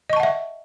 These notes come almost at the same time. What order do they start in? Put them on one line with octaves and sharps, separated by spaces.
D#5 C#6 A5 F#5 E5